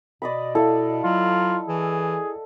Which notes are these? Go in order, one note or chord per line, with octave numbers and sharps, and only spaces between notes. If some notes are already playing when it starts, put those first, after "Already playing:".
B2 D5 D#5 B5
E4 A4 F5
F#3 F4
E3 G#4